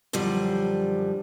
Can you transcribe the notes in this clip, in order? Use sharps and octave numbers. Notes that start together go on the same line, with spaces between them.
F#2 D3 F3 G3